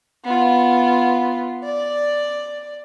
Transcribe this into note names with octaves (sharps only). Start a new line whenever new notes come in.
B3 F4
D5